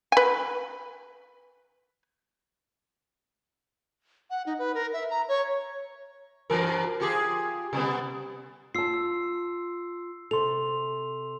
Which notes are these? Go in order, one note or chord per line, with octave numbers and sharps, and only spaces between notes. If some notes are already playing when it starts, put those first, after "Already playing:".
B4 G#5
F#5
D#4
B4
A#4
E5
A#5
C#5
G2 E3 A#4
F4 G4 G#4
C3 G3 B3
F4 A5 E6 C7
E6
C3 A4 C6 F7